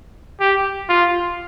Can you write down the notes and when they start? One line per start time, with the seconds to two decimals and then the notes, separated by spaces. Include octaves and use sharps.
0.40 G4
0.89 F4